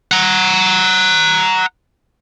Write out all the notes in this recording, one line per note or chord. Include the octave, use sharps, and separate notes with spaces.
F#5 A#5